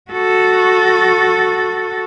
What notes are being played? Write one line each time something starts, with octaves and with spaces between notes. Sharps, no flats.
F#4 A4